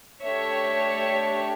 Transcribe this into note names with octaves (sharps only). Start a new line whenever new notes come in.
A3 D4 G4 C#5 E5